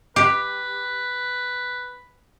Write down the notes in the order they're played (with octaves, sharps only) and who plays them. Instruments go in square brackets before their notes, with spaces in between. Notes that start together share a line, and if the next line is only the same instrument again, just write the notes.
[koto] G4 [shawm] B4